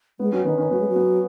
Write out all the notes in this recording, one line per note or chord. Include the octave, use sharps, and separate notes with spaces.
G#3 B3
F#3 C#4
D#3 B3
D#3 C#4
F#3 B3
G#3
F#3
B3